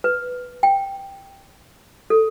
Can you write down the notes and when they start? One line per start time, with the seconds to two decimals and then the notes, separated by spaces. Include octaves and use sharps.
0.04 B4
0.63 G5
2.10 A4